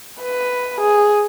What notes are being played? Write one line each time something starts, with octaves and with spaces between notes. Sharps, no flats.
B4
G#4